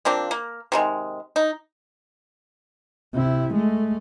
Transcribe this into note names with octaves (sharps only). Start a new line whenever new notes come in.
F3 A#3 C4 D4
A#3
C3 D#3 G#3
D#4
C3 E4
G#3 A3